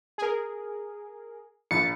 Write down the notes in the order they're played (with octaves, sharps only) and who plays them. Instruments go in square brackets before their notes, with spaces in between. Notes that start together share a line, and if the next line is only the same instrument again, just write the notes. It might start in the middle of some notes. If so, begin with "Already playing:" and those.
[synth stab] G#4 A#4
[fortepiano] A#1 [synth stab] A6 [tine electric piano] C#7